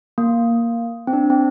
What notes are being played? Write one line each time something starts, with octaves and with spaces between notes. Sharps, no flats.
A#3
C4
D4
C4